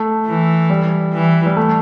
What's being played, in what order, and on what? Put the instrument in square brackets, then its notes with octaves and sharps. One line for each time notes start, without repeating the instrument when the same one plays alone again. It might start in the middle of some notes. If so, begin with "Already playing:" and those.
Already playing: [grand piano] A3
[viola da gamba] E3
[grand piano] G3
[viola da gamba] E3
[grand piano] G3
A3